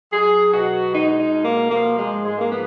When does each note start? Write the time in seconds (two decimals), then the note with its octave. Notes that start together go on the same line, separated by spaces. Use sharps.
0.11 F#3 G#4
0.51 B2 F#4
0.91 G#3 D#4
1.17 D#4
1.31 B2
1.44 A#3
1.70 F3 A#3
1.96 G#3
2.10 G#2
2.25 G#3
2.37 A#3
2.50 F3 B3